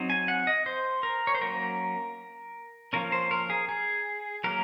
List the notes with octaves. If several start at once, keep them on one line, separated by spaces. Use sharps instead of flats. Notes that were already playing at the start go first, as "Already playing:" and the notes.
Already playing: F#3 C4 D#4
G#5
F#5
D#5
C5
A#4
C#5
C5
F#3 A#3 C#4 A#4
F3 A#3 C#4 A#4
C5
A#4
G#4
G#4
F#3 A#3 C#4 A#4